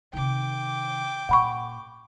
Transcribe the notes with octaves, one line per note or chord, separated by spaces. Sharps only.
C3 D#3 G5 D6
A#2 F#5 B5 C#6